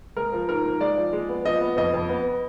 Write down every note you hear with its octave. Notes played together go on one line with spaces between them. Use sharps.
G#3 A#4
F3
G#2 A#4
G#2
G#3 D5
F3
G#3
B3
F3 D#5
B3
F2 D#5
F2
B3